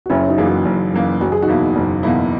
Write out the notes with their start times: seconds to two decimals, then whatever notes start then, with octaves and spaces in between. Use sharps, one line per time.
0.06 F#4
0.10 F#1 C#4 E4
0.28 D#4 F#4
0.38 F#2 E3 A#3 G#4
0.47 D#4 F#4
0.65 F#1
0.93 F#2 E3 A#3
1.21 F#1 F#4
1.32 G#4
1.42 D#4 F#4
1.48 E2 B2 A#3 E4
1.76 F#1
2.03 E2 B2 A#3 E4